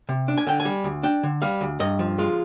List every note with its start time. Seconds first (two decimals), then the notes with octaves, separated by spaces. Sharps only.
0.09 C3
0.28 D4
0.38 G#5
0.47 D3 G5
0.60 G#5
0.65 G3
0.84 D2
1.03 D4 G5
1.23 D3
1.42 G3 F5
1.61 D2
1.80 G2 D#5
1.99 F3
2.18 G#3 F4